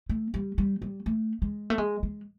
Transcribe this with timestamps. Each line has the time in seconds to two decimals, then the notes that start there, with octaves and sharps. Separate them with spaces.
0.09 A3
0.34 G3
0.58 G3
0.82 G3
1.06 A3
1.42 G#3
1.70 A3
1.78 G#3
2.03 G#3